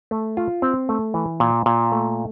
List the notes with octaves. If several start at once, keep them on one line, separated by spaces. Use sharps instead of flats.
A3
F4
C4
A3
E3
A#2
A#2
A3